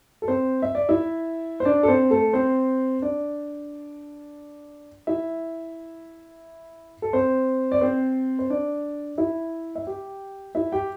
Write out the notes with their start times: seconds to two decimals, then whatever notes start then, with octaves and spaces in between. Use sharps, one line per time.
0.22 A4
0.28 C4 C5
0.62 E5
0.75 D5
0.89 E4 E5
1.60 C5
1.65 D4 D5
1.83 A4
1.88 C4 C5
2.11 A3 A4
2.33 C4 C5
3.02 D4 D5
5.07 E4 E5
7.02 A4
7.13 C4 C5
7.72 D5
7.81 C4 C5
8.39 C5
8.50 D4 D5
9.18 E4 E5
9.75 E5
9.87 G4 G5
10.55 E4 E5
10.72 G4 G5